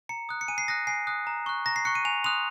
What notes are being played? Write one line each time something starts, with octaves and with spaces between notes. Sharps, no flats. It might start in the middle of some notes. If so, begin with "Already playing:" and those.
A#5 C#7
D#6 F#6
C#7
G#5 D#7
C7
D#6 F#6 A#6
G#5 C7
D#6 F#6
A#5
C#6 F#6
A#5 A#6
C7
C#6 F#6 C#7
D#7
G#5 F7
C6 D#6 F#6 F7